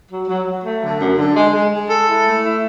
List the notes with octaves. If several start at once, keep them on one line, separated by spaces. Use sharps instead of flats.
F#3
F#3
F#3
A3
D3
F#2
D3
G#3
G#3
G#3
A4
E4
A3
E4